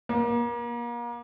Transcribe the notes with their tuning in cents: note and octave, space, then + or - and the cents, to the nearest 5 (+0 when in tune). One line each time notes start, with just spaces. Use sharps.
A#3 +35